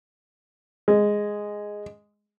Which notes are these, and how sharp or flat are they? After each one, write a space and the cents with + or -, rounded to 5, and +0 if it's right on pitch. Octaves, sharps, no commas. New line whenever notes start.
G#3 -5